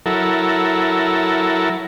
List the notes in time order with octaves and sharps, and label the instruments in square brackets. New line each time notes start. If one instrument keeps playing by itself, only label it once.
[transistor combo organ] F#3 E4 A4 A#4